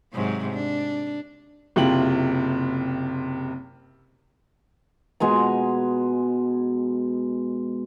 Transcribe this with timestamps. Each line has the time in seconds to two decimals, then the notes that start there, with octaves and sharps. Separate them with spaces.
0.13 G#2 C3 F#3
0.51 D4
1.76 F#1 C3 E4 F4 G5 F#7
5.20 B2 G#3 G#5 A#5